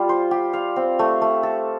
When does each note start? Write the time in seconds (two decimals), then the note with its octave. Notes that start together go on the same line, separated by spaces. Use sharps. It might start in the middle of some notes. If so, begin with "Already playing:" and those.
Already playing: G3 F4
0.09 C5
0.31 G4
0.53 F5
0.76 C4
0.99 A3
1.22 A3
1.43 A4